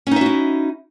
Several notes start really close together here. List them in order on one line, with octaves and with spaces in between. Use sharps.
C#4 D#4 E5 F#4 E4